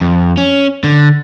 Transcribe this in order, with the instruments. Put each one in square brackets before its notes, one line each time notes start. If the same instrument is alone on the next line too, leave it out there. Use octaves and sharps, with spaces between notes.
[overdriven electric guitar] F2
C#4
D3